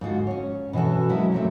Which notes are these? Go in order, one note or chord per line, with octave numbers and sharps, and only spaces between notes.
G#2 D3 F4 F#4
C#4 C#5
B2 E3 C#4 F#4 A4
F#3 G#3 A#3 C#4 E4
C3 F#3 A3